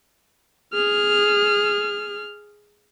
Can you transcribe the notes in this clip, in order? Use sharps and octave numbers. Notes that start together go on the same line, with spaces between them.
G#4 F6